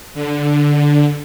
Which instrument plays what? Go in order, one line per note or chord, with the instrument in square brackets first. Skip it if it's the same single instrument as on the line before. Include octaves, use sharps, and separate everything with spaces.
[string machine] D3